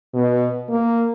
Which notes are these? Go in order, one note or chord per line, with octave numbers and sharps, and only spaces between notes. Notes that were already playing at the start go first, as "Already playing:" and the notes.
B2
A#3